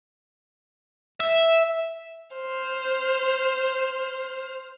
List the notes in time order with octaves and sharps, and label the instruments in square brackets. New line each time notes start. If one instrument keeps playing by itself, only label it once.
[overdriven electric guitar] E5
[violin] C5 F6